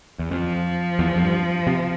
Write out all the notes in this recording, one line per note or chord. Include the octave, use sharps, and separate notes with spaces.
E2
F2 F3
E2
F2
G2
C3